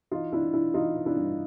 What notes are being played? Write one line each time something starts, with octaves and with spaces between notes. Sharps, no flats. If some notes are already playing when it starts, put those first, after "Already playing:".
E3 D#4 F4
E3 D4 E4
E3 D4 E4
E3 D#4 F4
E3
D4 E4
G2